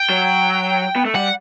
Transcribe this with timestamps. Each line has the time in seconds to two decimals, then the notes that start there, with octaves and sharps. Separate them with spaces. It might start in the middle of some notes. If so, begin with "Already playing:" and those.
Already playing: G5
0.10 F#3
0.96 B3
1.05 A3
1.14 G3 F#5